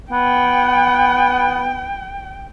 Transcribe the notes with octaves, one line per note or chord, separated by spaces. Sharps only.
B3 G5